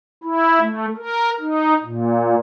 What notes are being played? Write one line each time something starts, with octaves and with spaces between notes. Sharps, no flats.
E4
A3
A#4
D#4
A#2